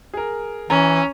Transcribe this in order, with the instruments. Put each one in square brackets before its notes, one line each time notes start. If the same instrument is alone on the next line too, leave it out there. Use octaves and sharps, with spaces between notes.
[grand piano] G#4 A#4
[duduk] E3 [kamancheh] C#4 [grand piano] A#5